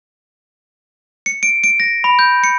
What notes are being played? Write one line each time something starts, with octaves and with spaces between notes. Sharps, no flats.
C#7
D7
D7
A#6
B5
G6
C#7